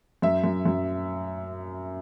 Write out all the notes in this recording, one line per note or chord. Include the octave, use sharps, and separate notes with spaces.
F#2 E5
F#2
F#2